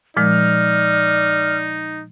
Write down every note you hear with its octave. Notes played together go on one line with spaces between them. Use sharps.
A#2 F3 G#3 D#4 D5 F6